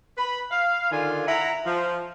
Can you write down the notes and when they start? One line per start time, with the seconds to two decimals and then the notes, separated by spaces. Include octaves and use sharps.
0.17 B4 B5
0.52 F5
0.91 D3 D#3 F4 G#5
1.28 E4 F#5 A#5
1.66 F3